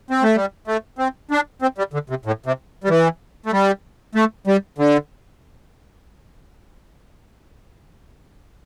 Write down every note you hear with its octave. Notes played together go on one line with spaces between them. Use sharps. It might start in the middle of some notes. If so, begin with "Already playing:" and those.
C4
A3
G3
A3
C4
D4
C4
G3
D3
C3
A2
C3
G3
E3
A3
G3
A3
G3
D3